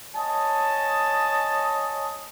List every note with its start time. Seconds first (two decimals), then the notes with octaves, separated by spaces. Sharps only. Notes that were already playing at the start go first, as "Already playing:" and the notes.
0.15 C#5 D#5 G#5 A5